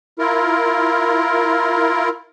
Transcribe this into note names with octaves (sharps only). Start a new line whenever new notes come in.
E4 F4 A#4